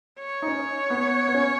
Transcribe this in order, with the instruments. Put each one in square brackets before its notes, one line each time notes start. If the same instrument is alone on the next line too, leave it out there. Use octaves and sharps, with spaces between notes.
[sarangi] C#5
[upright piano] D#4
C#4
B3
B3
C#4